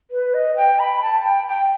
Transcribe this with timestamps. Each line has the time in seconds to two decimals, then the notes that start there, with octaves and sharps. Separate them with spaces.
0.11 B4
0.34 D#5
0.56 G5
0.79 B5
1.01 A5
1.24 G5
1.48 G5